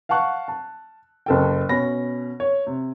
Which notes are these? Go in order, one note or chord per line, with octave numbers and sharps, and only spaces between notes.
F5 F#5 A5 C#6 F#6
A5
F#1 A4 G5
B2 C#4 B5 A#6
C#5
C3